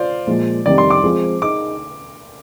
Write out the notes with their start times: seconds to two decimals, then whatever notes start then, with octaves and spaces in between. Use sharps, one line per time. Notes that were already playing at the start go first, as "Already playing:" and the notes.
Already playing: F4 C5 D5
0.27 A#2 F3 G#3
0.65 F2 C3 D#3 G3 D5
0.78 C6
0.90 D6
1.03 F3 G#3 C4 F4 G#4
1.42 D#4 G#4 D6